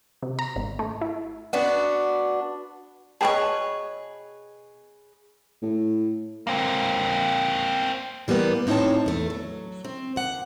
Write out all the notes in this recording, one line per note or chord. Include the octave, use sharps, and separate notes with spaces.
C3
A#5
G#1
A3
E4
B3 D4 F#4
B2 G#4 B4 C#5 G5 A5
A2
A#3 C4
E3 G3 A#3 B3
A2 C4 D#4 E4 C#5 A5
E2 A3
F#3
C4
D#2 F#5